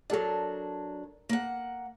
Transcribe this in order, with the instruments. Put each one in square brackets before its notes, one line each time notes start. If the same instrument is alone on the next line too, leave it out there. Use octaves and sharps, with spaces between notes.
[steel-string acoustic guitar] F#3 D4 [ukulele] A4 A#4 D5
[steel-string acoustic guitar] A#3 F#5